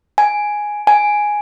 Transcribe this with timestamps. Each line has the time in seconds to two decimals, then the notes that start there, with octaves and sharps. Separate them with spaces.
0.18 G#5
0.87 G#5